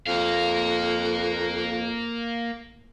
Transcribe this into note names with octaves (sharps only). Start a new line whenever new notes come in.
F2 A#3 F5